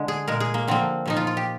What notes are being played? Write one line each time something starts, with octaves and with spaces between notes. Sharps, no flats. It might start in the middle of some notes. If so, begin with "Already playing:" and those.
Already playing: D3 G#3
G#4
A#2 G#3 A#4
G#4
A#3
D3 F3 A#3 C4
A#2 F3 A#3 D#4
F4
F4
G4